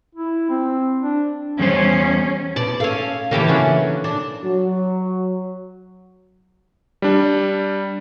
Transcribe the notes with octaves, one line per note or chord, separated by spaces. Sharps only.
E4
C4
D4
E2 G3 C#4 C5
B2 D5 A5
C#4 A4 F5
C#3 E3 A#3 G4 A4
F#3 C#4 D4
D4
F#3
G3 D4